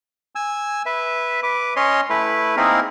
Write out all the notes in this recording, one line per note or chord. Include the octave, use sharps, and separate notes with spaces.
G#5 E6
B4 E5
B4 D6
C#4 C#5 D#5 C6
A3 E4 B4
A#3 C4 D#4 E4 G#4 A#4